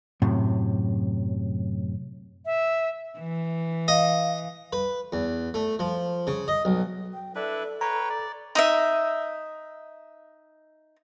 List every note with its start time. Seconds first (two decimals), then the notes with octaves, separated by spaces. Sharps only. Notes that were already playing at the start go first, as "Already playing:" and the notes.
0.22 F#2 A2 C3
2.46 E5
3.19 E3
3.88 D#5 F5
4.73 B4
5.13 E2
5.54 A3
5.79 F3
6.27 C#3
6.48 D#5
6.65 B1
7.13 G5
7.35 D4 E4 A4 B4
7.81 B4 C#5 G5 A#5
8.10 D5
8.55 D#4 D#5 E5